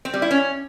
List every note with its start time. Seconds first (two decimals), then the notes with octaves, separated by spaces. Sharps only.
0.05 C4
0.14 G3
0.22 E4
0.31 C#4